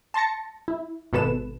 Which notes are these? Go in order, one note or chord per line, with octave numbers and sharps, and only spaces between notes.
A5 C6 A6 A#6 C#7
E4
G#1 B2 A4 B4 E7